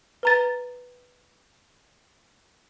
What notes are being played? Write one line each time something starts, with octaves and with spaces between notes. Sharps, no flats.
B4 A#5 A6